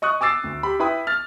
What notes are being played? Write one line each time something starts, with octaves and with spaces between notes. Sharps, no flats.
D#5 C#6 D#6 F#6
G#5 D6 E6 A6 C7
D2
G4 B5
E4 B4 G5 B5 D#6
F6 A6